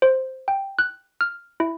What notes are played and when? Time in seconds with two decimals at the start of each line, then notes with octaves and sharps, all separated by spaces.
0.02 C5
0.48 G5
0.79 F#6
1.21 F6
1.60 E4